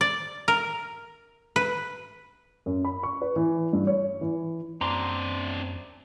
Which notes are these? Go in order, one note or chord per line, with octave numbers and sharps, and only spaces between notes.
D5
A#4
B4
F#2
B5
C#6
B4
E3
G2
C#5
E3
F#2 C4 D4 A#5 C6 D6